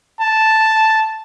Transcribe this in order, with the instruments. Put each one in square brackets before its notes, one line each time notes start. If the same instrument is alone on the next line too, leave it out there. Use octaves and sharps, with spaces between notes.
[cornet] A5